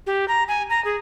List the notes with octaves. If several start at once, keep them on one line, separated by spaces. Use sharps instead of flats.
G4
A#5
G#5
A#5
G#4